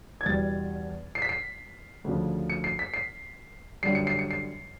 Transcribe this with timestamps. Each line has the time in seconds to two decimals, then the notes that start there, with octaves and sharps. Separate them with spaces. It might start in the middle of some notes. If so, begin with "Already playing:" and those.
0.21 G#6
0.26 E2 B2 G3 A6
1.15 C7
1.22 B6
1.29 C7
2.04 D2 C#3 F3
2.50 C#7
2.64 C7
2.79 B6
2.94 C7
3.83 F#2 D3 G3 C7
3.95 C#7
4.07 C7
4.19 C#7
4.31 C7